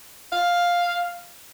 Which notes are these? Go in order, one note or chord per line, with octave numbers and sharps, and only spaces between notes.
F5